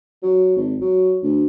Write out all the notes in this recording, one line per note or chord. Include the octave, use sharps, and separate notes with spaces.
F#3
G#1
F#3
D2